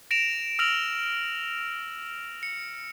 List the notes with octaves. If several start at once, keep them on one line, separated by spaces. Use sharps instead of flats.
A#6 D7 E7 F7
E6 F6 A#6 D7 F7 F#7
C#7